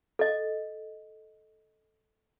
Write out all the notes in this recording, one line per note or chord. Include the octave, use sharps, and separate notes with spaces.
A4 D#5